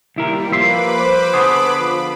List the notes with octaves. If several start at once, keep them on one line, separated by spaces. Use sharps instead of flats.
D#2 G3 E4 A#4
F3 A#3 B4 E5 B5 C6 D6
C5
D3 B3 G#4
F3 B5